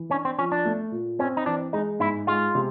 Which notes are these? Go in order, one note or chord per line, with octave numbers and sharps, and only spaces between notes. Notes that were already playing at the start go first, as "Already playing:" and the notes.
Already playing: E3
C#4 D4
C4
F3 C#4
D4
A3
A#2
C4 C#4
D#4
E3 D4
G#3 D#4
G#2 E4
G#3 F4
C3